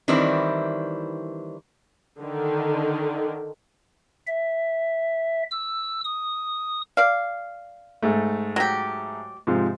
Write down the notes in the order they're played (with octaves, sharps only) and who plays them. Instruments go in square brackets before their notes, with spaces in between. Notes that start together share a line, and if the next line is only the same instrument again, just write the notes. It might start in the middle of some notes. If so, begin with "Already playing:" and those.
[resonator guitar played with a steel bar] D#3 E3 G3 C4 D4 E4
[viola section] D3 D#3
[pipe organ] E5
E6
D#6
[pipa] D5 F5
[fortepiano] G#2 A3
[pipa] F#3 G4
[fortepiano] G#2 C3 F3